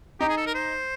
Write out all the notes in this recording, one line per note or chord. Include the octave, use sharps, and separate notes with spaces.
D#4 G4
G#4
A4
A#4
C5